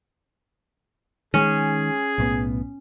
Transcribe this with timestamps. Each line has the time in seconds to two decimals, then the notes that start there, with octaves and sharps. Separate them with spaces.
1.34 D#3 G#3 C#4 G#4
2.18 B1 A2 B3